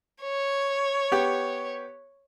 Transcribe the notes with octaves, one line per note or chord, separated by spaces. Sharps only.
C#5
B3 G4